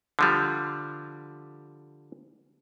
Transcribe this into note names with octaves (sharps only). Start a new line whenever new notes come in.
D3 F3 G3